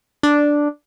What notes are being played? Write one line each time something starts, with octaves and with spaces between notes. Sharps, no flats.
D4